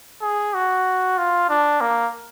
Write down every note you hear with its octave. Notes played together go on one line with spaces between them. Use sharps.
G#4
F#4
F4
D4
A#3